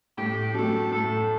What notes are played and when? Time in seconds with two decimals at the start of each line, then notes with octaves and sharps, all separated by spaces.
0.18 A2 G4
0.54 F#3 A3 A4
0.91 A2 A4